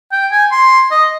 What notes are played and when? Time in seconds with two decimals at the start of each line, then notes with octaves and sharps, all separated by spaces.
0.12 G5
0.32 G#5
0.52 C6
0.91 D#5